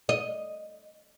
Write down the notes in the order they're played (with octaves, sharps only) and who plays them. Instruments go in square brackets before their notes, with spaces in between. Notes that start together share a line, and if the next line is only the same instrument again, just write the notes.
[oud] D#5